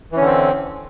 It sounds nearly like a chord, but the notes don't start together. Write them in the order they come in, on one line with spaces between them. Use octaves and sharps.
E3 C#4 D3 C4